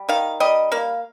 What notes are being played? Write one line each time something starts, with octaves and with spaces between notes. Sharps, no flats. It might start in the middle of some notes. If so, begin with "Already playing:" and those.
Already playing: G3
D#3 F5
G3 D#5
A#3 F5